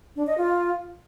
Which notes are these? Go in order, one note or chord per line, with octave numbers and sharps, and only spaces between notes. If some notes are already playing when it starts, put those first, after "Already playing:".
D4
D#5
F4